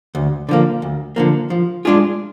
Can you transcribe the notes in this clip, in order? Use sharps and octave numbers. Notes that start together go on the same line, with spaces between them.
D2
D3 F3 A#3
D2
D3 F3 A#3
F3
G#3 D4 F4 G#4